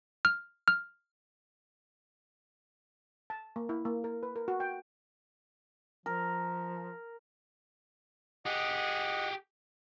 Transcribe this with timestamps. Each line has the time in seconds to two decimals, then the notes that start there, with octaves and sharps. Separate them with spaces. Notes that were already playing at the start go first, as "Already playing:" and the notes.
0.25 F6
0.68 F6
3.30 A5
3.56 A#3
3.69 E4
3.85 A#3
4.04 A#4
4.23 B4
4.36 A#4
4.48 F#4
4.60 G5
6.06 F3 A#4
8.46 G4 G#4 D#5 F#5